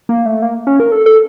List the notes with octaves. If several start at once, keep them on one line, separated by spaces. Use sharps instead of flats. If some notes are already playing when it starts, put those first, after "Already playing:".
A#3
A3
A#3
C#4
A#4
A4
A4